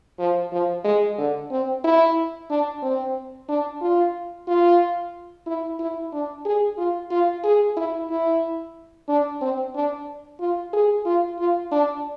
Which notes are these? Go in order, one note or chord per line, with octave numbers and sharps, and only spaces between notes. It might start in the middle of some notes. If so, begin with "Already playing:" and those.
F3
F3
G#3
D3
C4
E4
D4
C4
D4
F4
F4
E4
E4
D4
G#4
F4
F4
G#4
E4
E4
D4
C4
D4
F4
G#4
F4
F4
D4